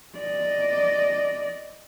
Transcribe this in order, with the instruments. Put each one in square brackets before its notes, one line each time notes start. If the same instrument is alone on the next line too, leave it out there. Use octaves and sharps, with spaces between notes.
[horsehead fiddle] D5 D#5